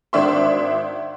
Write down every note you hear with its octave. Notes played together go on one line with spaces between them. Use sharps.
G#1 D4 E5 C6